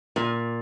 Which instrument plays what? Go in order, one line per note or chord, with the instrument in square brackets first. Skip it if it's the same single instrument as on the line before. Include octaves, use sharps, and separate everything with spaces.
[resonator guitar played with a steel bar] A#2